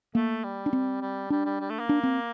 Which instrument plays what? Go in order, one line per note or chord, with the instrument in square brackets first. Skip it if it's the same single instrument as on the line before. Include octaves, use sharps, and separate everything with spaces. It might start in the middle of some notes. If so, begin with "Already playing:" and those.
[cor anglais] A3 [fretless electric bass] A#3
[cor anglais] G3
[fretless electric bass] D4
C4
[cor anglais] G3
[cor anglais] G3 [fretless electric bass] D4
[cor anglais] G3
G3
A3
A#3
[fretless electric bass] D4
C4